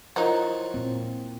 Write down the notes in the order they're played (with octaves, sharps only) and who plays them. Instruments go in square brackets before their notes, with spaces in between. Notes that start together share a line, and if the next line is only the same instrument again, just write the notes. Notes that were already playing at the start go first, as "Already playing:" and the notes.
[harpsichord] F3 [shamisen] F#3 D#4 [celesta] E4 A#4
[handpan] A#2 C4